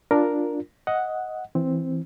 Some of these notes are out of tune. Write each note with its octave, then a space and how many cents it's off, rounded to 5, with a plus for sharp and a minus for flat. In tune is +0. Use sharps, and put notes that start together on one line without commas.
D4 +0 F4 +0 A#4 +0
D#5 +10 F#5 +0
E3 +0 C4 +0